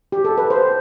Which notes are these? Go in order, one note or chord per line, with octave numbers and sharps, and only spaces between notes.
G4
A4
B4
C5